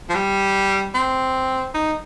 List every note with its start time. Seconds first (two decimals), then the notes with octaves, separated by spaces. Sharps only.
0.09 F3
0.15 G3
0.95 C4
1.75 D#4